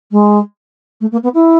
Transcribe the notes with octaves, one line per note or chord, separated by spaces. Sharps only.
G#3
A3
A#3
B3
E4